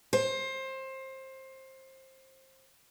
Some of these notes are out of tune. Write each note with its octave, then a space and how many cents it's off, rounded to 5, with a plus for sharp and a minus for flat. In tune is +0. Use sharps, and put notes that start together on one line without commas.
C5 +20